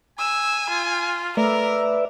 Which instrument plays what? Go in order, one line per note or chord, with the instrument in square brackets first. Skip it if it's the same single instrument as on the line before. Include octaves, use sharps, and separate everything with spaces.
[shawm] G#5 [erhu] E6
[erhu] F4
[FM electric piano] A3 [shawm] A#4 [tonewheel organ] B4 D5 E5 [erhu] A#5